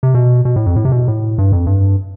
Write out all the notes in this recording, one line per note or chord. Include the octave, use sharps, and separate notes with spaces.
C3
B2
B2
A2
F2
A2
C3
B2
A2
G2
F2
G2